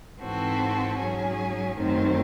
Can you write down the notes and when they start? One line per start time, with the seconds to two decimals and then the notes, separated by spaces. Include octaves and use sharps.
0.20 G#2 E3 C4 F#4 A4
0.98 G#2 F#3 C#4 G#4
1.76 F#2 D#3 A3 C4